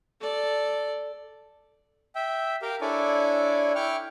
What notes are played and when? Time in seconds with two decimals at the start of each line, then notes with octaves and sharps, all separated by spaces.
0.20 A4 D5
2.15 E5 G5
2.62 G4 A#4 F5 G5
2.81 D4 E4 A4 C#5 D5 G#5
3.75 E4 G5 C#6 D6 F6